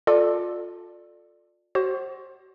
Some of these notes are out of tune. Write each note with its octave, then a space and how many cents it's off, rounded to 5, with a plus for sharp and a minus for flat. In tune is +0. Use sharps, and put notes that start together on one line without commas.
F4 +25 A4 +0 D5 +15
F#4 +35 C5 +30